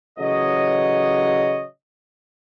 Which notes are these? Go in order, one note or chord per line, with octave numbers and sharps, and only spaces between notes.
A1 C#3 F#3 C#5 D#5